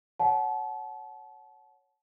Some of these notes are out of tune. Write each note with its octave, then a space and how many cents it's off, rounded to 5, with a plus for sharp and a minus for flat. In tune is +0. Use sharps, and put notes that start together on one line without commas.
C#5 +0 F#5 +0 A5 -30